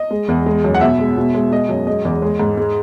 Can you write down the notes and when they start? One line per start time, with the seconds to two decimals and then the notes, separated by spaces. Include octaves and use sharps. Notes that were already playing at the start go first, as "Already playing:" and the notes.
Already playing: D#5
0.11 G#3
0.29 E2
0.46 G#3
0.64 F#2
0.75 F#5
0.81 B2 E5
0.99 G#3
1.17 B2
1.34 G#3
1.52 G#3 D#5
1.69 F#2
1.87 G#3 D#5
2.05 E2
2.22 G#3
2.40 G#2
2.57 G#3